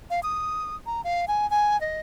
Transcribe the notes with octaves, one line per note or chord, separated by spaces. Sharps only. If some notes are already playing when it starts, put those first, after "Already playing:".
F5
D#6
A#5
F5
G#5
G#5
D#5